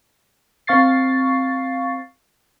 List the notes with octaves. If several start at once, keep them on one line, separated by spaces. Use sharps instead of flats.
C4 F5 C#6 A6 C7